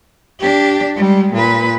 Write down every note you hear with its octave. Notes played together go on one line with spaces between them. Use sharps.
D4 G4
G3 G#3
A#2 B4